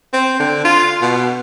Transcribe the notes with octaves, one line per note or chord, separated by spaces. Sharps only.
C4
D3
F4
B2